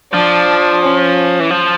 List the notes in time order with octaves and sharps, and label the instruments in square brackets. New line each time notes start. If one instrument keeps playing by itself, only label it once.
[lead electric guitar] F3 [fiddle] D4
[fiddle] C#4
[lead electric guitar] E3
F3